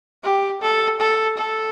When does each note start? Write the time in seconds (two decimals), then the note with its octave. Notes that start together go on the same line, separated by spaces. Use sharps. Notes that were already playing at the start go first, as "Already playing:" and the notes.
0.24 G4
0.62 A4
1.00 A4
1.38 A4